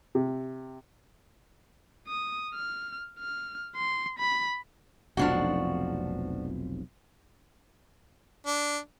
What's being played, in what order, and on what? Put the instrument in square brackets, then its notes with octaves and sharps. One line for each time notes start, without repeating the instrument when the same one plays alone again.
[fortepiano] C3
[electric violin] D#6
F6
F6
C6
B5
[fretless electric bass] F1 B1 F2 [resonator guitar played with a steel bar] F3 D4 F#4
[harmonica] D4